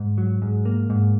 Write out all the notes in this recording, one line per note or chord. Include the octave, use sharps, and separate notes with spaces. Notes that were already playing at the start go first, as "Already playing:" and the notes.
Already playing: G#2
F#3
G#2
A#3
G#2